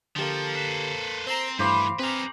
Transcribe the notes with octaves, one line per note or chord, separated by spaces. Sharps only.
D3 F3 A#3 G4 A4
B4 C5
C4 C5 A#5 C6
G2 E3 A3 E4 C5 F5 B5 D6
C4 G#4 B4 F5 A#5